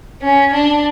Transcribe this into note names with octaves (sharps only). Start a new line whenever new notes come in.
C#4
D4